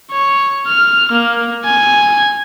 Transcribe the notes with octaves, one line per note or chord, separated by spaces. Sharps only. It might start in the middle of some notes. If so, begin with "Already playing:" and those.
C#5
F6
A#3
G#5